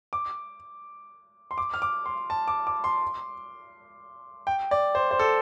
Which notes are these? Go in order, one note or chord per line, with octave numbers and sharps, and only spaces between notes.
D6
C6
D6
F6
D6
C6
A5
D6
D6
C6
G5
D5
C5
C5
A4